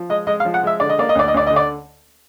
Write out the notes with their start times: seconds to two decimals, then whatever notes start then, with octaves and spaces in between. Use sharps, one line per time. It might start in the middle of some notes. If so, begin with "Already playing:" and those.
Already playing: F3
0.09 G#3 D#5
0.27 G#3 D#5
0.40 F5
0.45 F3
0.54 F#5
0.63 G#3 E5
0.80 D3 D5
0.90 D#5
0.99 A#3 D5
1.09 D#5
1.15 D2 D5
1.28 D#5
1.34 D2 D5
1.47 D3 D#5
1.56 D5